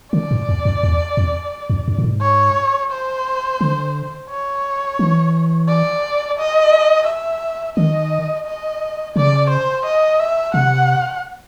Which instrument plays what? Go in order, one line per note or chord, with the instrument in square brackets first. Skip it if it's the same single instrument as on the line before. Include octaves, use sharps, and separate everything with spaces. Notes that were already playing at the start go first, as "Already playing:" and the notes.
[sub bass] D3 [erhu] D5
[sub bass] G#2
E2
F2
E2
F2
F2
F#2
A2
G#2
[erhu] C#5
C5
[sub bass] D3
[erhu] C#5
[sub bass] E3
[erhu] D5
D#5
E5
[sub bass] D#3 [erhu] D#5
[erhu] D#5
[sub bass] C#3 [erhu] D5
[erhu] C5
D#5
E5
[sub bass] C3 [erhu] F#5